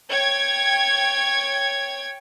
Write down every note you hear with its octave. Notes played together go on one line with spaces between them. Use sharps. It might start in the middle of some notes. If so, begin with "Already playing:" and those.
C#5 G5 G#6